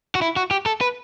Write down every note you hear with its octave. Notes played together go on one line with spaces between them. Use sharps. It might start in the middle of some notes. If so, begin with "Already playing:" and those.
F#4
E4
F#4
G4
A4
B4